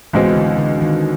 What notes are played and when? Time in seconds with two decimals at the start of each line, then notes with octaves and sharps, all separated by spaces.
0.13 C#2 B2 E3 G#3 C4
0.36 D3
0.58 D3
0.82 D#3